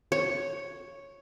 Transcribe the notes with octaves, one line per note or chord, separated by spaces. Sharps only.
C#5